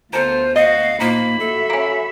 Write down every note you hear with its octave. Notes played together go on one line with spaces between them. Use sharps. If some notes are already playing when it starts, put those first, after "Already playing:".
D2 B3 F4 A4 A#4 C5
F#4 D#5 F5
A#2 F3 A#3 D#4 B5
F#4 A4 E5
A#3 C#4